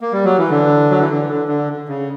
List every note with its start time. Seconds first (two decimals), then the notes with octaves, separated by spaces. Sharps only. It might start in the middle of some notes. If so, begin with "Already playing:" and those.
0.00 A#3
0.12 G3
0.25 F#3
0.38 E3
0.50 D3
0.90 F#3
0.99 E3
1.09 D3
1.29 D3
1.48 D3
1.88 C#3